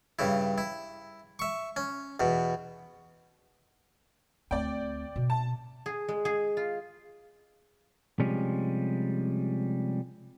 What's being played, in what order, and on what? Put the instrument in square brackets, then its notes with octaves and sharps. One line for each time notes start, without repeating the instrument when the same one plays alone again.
[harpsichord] G2 C#3 E4
E4
E5 C#6
C#4
E2 B2
[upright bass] D2 C4 [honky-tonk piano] D5 G5
[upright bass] B2
[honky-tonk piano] A5
[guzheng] G#4
G#3
G#4
F4
[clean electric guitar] C3 F3 G3 G#3 C#4